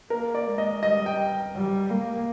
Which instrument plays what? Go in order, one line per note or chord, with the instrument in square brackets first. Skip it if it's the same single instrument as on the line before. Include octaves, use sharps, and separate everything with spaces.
[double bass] A#3 [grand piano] A#4
[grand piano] D5
[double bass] G#3
[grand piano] D#5
[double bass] G3 [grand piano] D#5
[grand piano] G5
[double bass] G3
A#3